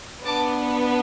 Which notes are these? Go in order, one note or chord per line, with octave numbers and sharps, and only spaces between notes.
B3 D4 A5 D6